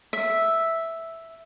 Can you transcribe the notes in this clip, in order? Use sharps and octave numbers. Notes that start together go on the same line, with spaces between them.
E5